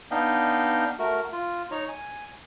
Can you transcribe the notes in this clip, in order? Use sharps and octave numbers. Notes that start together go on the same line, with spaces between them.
B3 D4 D#4 D#5 F5 G5
A3 F#4 A#4
F4
D#4 C#5 A#5
G#5